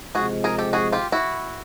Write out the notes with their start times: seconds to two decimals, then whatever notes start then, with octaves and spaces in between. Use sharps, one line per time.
0.14 C3 F3 G#3 F#4 G#4
0.44 G#4 A#4
0.58 G4 A4
0.73 F#4 G#4
0.92 F4 G4
1.12 E4 F#4